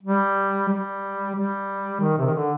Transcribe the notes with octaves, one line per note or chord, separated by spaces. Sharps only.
G3
G3
G3
D#3
C3
D#3
D3